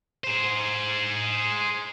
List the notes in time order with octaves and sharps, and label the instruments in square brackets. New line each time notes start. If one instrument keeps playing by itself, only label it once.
[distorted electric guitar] G#4 C5